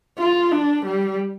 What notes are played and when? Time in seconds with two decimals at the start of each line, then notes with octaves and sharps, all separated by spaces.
0.19 F4
0.52 D4
0.86 G3